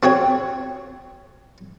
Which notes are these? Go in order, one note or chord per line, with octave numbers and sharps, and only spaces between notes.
C4 F#4 C#5 G5